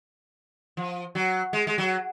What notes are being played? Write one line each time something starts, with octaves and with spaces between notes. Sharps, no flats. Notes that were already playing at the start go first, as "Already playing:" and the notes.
F3
F#3
G#3
G#3
F#3